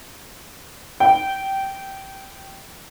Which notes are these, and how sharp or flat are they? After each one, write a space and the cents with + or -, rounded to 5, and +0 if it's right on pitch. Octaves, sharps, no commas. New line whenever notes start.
G5 -15